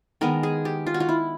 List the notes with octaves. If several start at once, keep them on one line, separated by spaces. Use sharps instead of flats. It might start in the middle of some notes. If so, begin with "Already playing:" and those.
D#3 G#3 B3 A#4
G#4
G4
F4
F#4
F4
E4